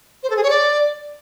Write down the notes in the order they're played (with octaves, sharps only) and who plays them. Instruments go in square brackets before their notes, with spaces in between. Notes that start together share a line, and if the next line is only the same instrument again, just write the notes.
[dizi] C5
A4
G#4
C#5
D5